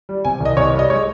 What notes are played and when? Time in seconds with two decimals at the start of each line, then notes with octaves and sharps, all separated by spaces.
0.09 G3
0.25 C3 G#5
0.40 C2 D#5
0.57 C2 C#5
0.73 G3
0.79 D#5
0.90 G#3 C#5